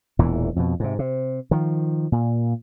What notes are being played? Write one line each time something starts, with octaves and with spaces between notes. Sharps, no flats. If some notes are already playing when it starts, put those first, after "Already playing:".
E1 E2 A#2 E3
F2 B2
G#2 C3
C3
D#3 F3
A#2